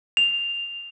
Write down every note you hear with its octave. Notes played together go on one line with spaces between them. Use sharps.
F7